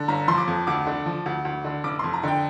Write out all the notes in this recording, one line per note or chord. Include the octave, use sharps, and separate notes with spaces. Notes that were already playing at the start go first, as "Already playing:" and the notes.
Already playing: D3
G1 A#5
F3 C6
D6
F2
D2 D6
D3
F3
D2
D2
D3
F1 D6
F2 C6
A#5
D3 G5